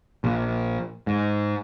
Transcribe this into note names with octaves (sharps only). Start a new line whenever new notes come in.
A#1
G#2